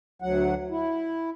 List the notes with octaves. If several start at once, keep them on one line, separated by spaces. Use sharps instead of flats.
D2 F#3 F#5
E4